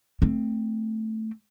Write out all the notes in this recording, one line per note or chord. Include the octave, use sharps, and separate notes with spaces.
A3 C4